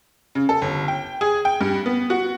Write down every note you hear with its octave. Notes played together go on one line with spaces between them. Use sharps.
C#3
A4
G1
G5
G#4
G5
G2
B3
F#4